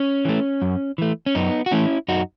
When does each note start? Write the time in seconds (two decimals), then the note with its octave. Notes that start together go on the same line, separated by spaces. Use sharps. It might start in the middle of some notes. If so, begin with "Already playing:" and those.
Already playing: C#4
0.25 E3 A3
0.62 F#2
0.98 E3 A3
1.26 C#4
1.35 F#2 B3 D#4
1.66 F#4
1.71 E3 A3 C#4 E4
2.08 F#2 D#4 F#4